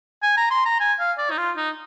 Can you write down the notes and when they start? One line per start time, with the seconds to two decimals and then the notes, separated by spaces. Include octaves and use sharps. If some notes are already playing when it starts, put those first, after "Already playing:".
0.22 G#5
0.37 A#5
0.51 C6
0.66 A#5
0.80 G#5
1.00 F5
1.18 D5
1.31 D#4
1.38 F4
1.57 D#4